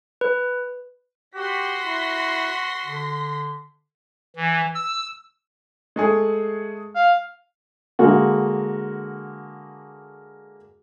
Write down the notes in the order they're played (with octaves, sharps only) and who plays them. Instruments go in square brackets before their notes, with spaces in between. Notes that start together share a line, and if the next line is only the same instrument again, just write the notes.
[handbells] B4
[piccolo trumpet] F#4 [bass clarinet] G4 [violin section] C6 A#6 B6
[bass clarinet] E4
D3
[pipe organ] E3
E6
[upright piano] G#3 A3 G#4
[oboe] F5
[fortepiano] D3 G#3 A#3 F#4